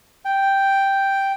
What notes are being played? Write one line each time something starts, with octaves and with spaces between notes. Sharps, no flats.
G5